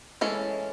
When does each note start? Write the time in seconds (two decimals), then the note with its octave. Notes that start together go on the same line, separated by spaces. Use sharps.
0.21 E3 G#3 C#4 A4